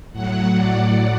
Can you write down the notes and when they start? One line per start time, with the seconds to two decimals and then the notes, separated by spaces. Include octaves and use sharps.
0.12 A2 F#3 F#5
0.55 D5